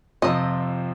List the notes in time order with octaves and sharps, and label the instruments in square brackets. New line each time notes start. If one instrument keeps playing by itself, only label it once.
[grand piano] F2 C3 F3 C4 [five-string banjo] D#5